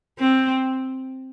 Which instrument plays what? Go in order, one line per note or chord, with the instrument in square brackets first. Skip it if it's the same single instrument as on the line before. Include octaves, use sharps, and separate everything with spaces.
[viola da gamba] C4